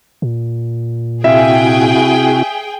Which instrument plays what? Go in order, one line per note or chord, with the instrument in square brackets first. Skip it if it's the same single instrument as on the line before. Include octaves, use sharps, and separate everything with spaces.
[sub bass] A#2
[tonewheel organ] C3 E4 F#4 [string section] G#4 G5 [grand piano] E5 F5